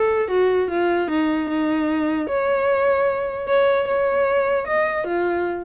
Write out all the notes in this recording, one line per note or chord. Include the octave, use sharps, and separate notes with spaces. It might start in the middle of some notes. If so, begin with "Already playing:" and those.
Already playing: A4
F#4
F4
D#4
D#4
C#5
C#5
C#5
D#5
F4